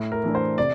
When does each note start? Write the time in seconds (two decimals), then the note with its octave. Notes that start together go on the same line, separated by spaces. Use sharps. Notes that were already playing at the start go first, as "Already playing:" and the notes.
Already playing: A2
0.12 A#4
0.24 E3 A3 D4
0.35 C5
0.58 C3 D5